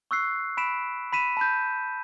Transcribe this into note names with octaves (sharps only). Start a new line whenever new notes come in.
C#6 E6 F#6 C7
B5 B6 D7 E7
B5 B6 D#7 E7
A5 B5 G6